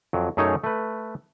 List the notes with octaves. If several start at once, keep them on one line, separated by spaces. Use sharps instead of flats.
F2 F#3
F#2 A3 D#4 G#4 C#5
A3 B4